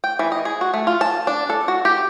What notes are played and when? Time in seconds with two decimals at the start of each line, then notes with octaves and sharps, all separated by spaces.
0.04 G5
0.19 E3
0.32 D#5
0.45 G#4
0.61 F#4
0.74 A3
0.87 F4
1.01 A5
1.27 D4
1.49 A4
1.68 F#4
1.85 G4